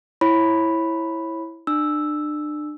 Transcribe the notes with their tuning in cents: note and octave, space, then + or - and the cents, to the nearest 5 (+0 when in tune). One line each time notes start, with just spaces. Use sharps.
E4 +0 C#5 -25 B5 +0
D4 +30 E6 +0